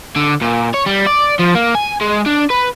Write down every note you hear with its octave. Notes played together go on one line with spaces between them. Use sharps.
D3
A#2
C#5
G3
D5
F3
A#3
G#5
G#3
D4
B4